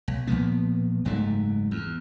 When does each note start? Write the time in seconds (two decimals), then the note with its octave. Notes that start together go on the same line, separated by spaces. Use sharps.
0.08 B1
0.27 B1 A#2 F3 B3
1.05 F#1 G#2 F#3 A3
1.71 E2